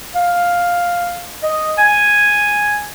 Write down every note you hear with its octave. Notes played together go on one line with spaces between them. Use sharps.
F5
D#5
G#5